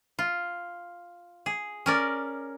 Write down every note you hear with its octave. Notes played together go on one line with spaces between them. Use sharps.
F4
G#4
C#4 A#4 D5